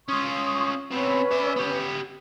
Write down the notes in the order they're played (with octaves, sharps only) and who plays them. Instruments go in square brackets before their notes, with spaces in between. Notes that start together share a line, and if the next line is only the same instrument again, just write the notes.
[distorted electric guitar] C#4 F4 [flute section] C6 C#6 D#6
[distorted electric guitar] C3 B3 [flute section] C#4 B4
[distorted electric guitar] D5 E5
B3 G4